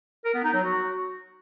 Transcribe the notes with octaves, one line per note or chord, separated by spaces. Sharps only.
A#4
B3
D#4
F#3
F#4